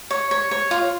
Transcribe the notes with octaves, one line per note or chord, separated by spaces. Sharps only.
C#5
C#5
C#5
F4